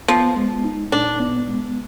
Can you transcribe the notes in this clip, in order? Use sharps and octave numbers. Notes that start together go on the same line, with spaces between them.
F3 B3
G#3
D#4
A#2 D4
B3
G#3